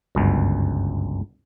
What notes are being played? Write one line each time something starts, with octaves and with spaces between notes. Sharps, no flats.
G1 C#2 F#2